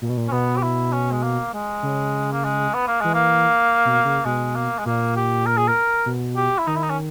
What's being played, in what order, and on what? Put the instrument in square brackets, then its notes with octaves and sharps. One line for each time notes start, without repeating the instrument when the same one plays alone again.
[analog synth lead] A#2
B2
A#2
[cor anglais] C#4
[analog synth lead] B2 [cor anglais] B3
[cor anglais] G4
E4
C#4
G#3
A#3
G#3
[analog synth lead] C#3
[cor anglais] A#3
G#3
B3
A#3
[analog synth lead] E3 [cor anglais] G#3
[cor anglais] A#3
[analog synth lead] B2
C#3
[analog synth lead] B2 [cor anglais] G#3
[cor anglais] A#3
G#3
[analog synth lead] A#2 [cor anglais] A#3
[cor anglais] G4
A#4
G#4
A#4
[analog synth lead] B2
[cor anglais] G4
E4
[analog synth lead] D#3 [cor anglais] D#4
[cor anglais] E4
D#4
C#4